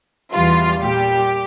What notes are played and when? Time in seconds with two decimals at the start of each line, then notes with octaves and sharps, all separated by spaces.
0.33 E2 E3 G3 F4
0.81 A#2 G3 G4